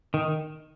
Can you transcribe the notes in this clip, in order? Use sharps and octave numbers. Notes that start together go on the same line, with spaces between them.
D#3